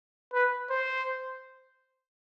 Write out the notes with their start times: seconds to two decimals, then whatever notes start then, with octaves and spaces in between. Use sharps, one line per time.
0.33 B4
0.70 C5